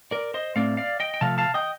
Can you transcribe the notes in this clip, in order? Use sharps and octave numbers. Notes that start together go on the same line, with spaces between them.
A#4 D5
C5 D#5
A2 A3 C4 D5 F5
D5 F5
D#5 G5
G5
C3 F3 A3 F5 A5
F5 A5
D#5 G5